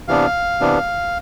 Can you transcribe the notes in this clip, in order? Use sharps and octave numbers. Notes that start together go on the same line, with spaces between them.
C3 E3 B3 D4 F5
C3 E3 B3 D4